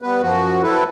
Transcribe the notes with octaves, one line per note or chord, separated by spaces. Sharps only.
G3 B3 B4
F#2 F3 F#4
F#3 C4 E4 A4 B4